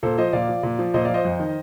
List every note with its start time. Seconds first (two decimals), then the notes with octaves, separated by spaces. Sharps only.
0.03 A#2 A4 C5
0.18 F3 C5 D#5
0.33 A#2 D5 F5
0.49 F3
0.63 A#2
0.79 F3
0.94 A#2 C5 D#5
1.05 F3 D5 F5
1.14 C5 D#5
1.25 F2
1.40 D#3